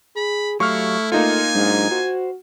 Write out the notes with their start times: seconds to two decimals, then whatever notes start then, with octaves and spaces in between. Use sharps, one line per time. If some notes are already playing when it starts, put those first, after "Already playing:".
0.16 G#4 B5
0.60 F#3 A3 E4 G4 F5 C#6 F6
1.12 A#3 D#4 F4 A4 G#5
1.55 G#2 F#3 G#3 D4
1.91 F#4 C5